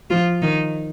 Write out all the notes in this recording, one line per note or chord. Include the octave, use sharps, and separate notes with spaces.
F3 F4
D#3 D#4